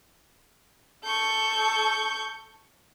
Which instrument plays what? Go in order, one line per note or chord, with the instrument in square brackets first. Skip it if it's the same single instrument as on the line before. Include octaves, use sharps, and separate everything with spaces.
[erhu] A4 [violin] C#6 G6